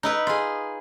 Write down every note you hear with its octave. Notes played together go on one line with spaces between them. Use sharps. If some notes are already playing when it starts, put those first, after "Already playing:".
D#4 E4 B4
F4 G#4